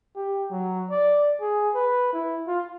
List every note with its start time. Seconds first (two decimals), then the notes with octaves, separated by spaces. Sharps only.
0.16 G4
0.51 F#3
0.90 D5
1.41 G#4
1.74 B4
2.13 E4
2.47 F4